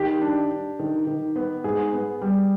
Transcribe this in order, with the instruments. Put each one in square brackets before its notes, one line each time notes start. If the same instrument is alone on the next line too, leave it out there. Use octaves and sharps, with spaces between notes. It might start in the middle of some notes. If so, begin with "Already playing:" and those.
Already playing: [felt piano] D#3 [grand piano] G4
[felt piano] D4
D4
D#3
D#3
B3
[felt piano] G#2 [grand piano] G#4
[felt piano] B3
G3